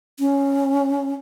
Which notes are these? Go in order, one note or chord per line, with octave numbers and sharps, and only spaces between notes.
C#4